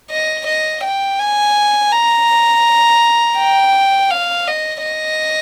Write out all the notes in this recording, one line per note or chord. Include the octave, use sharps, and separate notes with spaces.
D#5
D#5
G5
G#5
A#5
G5
F5
D#5
D#5